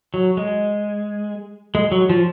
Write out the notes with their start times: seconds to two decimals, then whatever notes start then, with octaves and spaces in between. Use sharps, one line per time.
0.14 F#3
0.37 G#3
1.75 G#3
1.92 F#3
2.09 F3